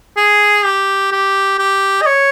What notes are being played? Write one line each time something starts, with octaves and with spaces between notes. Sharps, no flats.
G#4
G4
G4
G4
D#5
C#5